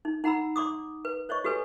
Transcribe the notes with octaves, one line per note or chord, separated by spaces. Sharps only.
D#4
D#4 F#5 A#5 B5 E6
D5 C6 D6 D#6
B4
C5 C#5 D#5 C#6
F#4 G4 A4 B4 C#5 G#5